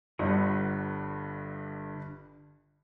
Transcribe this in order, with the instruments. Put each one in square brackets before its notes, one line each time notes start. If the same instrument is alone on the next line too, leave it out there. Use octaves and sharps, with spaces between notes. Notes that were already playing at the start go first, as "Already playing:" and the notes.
[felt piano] G1 G2 [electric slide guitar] D3 F4 F#5